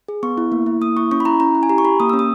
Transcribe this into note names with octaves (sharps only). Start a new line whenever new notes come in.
G#4
B3 C#6
E4
A#3
E4
A#3 D#6
E4 C#6
C#4 C#6
B5
E4 A#5
C#4 A#5
E4
G#5
G4 A#5
C#6
G4 B5
A#3 D#6
C#4 E6
D#6